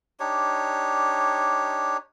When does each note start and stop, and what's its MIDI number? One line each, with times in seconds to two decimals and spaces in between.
0.20 1.97 62
0.20 1.97 63
0.20 1.97 67
0.20 1.97 73